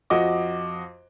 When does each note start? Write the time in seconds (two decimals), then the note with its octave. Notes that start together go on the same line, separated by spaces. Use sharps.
0.10 F2 F#4 D#5 D6